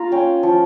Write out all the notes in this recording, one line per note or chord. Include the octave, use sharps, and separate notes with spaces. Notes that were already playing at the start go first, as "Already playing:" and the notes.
Already playing: A#3 F4 F5 A#5
C#4 G5
F3